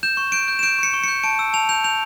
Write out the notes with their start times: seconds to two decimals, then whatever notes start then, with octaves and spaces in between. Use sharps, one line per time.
0.03 G6 E7
0.17 C#6
0.32 G6 D7
0.48 G6
0.59 E7
0.63 G6 D7
0.79 C#6 C#7
0.94 C#6
1.04 G6 C#7
1.24 A5 D7
1.39 E6
1.53 A5 F7
1.69 G6 F7
1.84 G6 F7